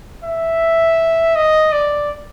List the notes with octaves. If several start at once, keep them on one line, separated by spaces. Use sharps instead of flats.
E5
D#5
D5